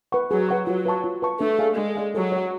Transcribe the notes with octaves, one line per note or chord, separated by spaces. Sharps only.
B4 F#5 C#6
F#3 G#4
B4 F#5 C#6
F#3 F4
B4 F5 A5 C#6
F4
B4 F5 A5 C#6
A3 D4
G#4 D5 F5 G#5
G#3 D4
G#4 D5 F5 G#5
F#3 A4
C#5 F#5